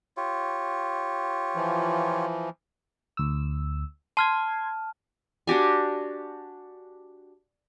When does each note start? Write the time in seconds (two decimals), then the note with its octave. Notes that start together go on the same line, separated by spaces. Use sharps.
0.17 F4 G4 C#5
1.55 E3 F3
3.17 D2 E6
4.17 A5 C6 F6 G#6
5.47 D4 F#4 G4 G#5